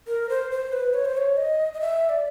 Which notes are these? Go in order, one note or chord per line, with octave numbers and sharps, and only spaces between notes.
A#4
C5
C5
B4
C#5
C5
C#5
D#5
D#5
E5
D5